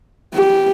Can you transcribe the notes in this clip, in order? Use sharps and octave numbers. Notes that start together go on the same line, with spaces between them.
G4